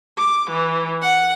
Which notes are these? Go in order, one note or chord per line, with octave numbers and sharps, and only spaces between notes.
D6
E3
F#5